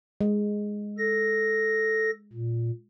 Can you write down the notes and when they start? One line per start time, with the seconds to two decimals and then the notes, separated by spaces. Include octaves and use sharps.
0.21 G#3
0.98 A4 A#6
2.33 A#2